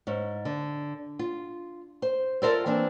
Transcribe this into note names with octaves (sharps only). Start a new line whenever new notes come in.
G#2 C#4
D3
F4
C5
F4 A4 A#4 C5 D5 E5
E3 A#3 C4 D4